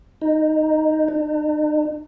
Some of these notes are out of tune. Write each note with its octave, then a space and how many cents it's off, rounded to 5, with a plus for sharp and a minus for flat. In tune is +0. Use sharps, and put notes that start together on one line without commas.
D#4 -5
D#4 -45